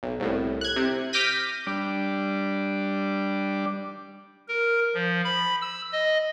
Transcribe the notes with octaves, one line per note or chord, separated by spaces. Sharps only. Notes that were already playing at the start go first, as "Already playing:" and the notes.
B1
C2 A2
F#6 G#6
C3
D6 F6 G6 A#6 B6 D#7
G3 D4 D5
A#4
F3
B5
E6
D#5